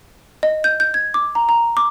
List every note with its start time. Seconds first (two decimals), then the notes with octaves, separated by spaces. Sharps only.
0.43 D#5
0.64 G6
0.80 G6
0.94 G#6
1.14 D6
1.35 A#5
1.49 A#5
1.77 D6